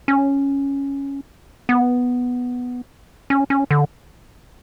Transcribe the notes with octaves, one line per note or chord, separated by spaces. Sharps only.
C#4
B3
C#4
C#4
D3